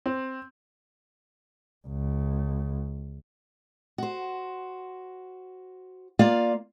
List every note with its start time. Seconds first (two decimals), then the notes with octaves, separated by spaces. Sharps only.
0.06 C4
1.88 C#2
3.98 F#4 C5
6.19 A#3 F4 D5 F5